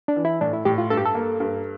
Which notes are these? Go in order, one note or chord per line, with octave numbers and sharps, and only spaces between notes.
D4
E3
E4
A2 D4
E4
A2 G4
F4
G2 A4
G4
A4
A#3
G2